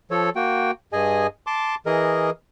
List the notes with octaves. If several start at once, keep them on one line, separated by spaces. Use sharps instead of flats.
F3 A4 C#5
A#3 F#4 G5
G2 G#4 D#5 G#5
A5 C6 D6
E3 G#4 A#4 D#5